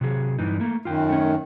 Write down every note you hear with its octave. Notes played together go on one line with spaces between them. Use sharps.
C3 F#3 G#4
G2 E3 D#4
A3 A#3
F#2 D#3 F4 G5
A3 C#4